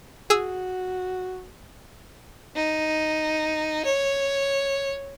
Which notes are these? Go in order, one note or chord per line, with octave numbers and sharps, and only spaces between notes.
F#4 G#4 E6
D#4
C#5